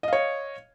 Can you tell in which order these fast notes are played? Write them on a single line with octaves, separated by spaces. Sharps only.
D#5 F5 C#5